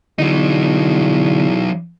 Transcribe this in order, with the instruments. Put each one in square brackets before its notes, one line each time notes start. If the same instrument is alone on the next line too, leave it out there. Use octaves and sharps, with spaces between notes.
[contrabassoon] E2 [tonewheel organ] D3 [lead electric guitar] F#3 D#4